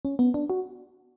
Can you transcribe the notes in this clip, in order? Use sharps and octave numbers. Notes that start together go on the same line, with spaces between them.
C#4
B3
D4
F#4